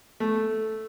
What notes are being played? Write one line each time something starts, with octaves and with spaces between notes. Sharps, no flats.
A3